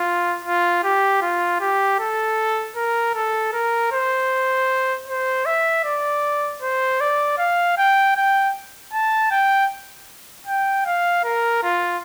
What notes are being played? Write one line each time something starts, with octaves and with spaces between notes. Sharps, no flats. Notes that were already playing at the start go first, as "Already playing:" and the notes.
Already playing: F4
F4
G4
F4
G4
A4
A#4
A4
A#4
C5
C5
E5
D5
C5
D5
F5
G5
G5
A5
G5
G5
F5
A#4
F4